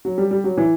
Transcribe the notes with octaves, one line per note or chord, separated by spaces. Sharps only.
F#3
G3
G3
F#3
E3